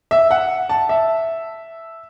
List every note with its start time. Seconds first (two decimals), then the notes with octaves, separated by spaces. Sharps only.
0.11 E5
0.31 F#5
0.69 A5
0.89 E5